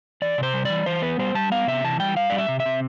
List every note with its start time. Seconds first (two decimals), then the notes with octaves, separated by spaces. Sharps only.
0.22 E3 D5
0.38 C3
0.43 C5
0.54 G3
0.65 E3 D5
0.86 E3 C5
1.02 B3 B4
1.19 G3 C5
1.35 G3 A5
1.51 B3 F5
1.67 C3 E5
1.84 E3 A5
2.00 G3 G5
2.17 G3 F5
2.30 G3 D5
2.38 E5
2.48 C3
2.60 E5
2.66 C3